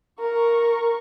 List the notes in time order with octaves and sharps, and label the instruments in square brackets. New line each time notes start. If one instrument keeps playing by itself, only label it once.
[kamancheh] A#4 C#6